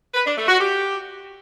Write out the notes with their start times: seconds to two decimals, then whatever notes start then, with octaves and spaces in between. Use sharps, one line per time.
0.14 B4
0.26 D4
0.37 A3
0.48 F#4
0.60 G4